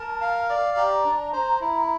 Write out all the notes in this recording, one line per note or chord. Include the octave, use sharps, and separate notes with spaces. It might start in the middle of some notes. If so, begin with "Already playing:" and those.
Already playing: A#4 A5
F5
D5
G4 A#5
D4
C5
E4